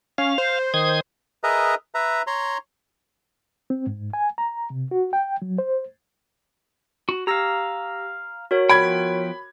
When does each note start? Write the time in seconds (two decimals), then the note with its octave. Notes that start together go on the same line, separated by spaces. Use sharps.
0.18 C#4 F5
0.38 C5
0.74 D#3 D#6 G#6
1.44 G#4 A#4 B4 D#5 E5 A#5
1.95 B4 E5 A#5
2.27 C#5 A#5 C6
3.70 C4
3.87 G#2
4.13 G#5
4.38 A#5
4.70 C3
4.91 F#4
5.13 G5
5.42 F#3
5.58 C5
7.09 F#4
7.27 G4 F5 A#5 E6 A#6
8.51 F#4 A#4 C#5
8.69 F3 B3 G5 B5 G#6